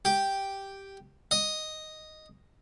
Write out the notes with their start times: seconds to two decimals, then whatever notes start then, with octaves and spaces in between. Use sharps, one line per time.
0.05 G4
1.31 D#5